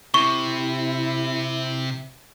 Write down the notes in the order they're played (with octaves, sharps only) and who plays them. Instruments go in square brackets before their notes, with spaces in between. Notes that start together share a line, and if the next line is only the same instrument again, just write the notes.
[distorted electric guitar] C3 [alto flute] E4 [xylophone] C#6